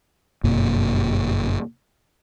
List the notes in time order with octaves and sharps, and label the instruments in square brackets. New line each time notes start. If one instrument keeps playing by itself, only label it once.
[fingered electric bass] G1 F#2 B2 A#3